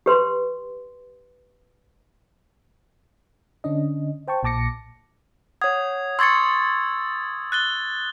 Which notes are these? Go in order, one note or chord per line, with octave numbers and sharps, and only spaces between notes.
G4 B4 C6
D3 C#4 D4 D#5
C5 G5 A5 C#6
A#1 A#2 A5 D6 A#6 C#7
C#5 F#5 D#6 G#6
C6 C#6 E6 G#6 A6 C#7
F#6 A6 G7